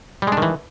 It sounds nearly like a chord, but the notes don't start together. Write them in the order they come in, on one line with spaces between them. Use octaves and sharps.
G3 G#3 D4 D#3 E3